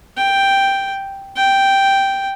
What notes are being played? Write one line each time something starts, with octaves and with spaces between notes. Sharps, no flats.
G5
G5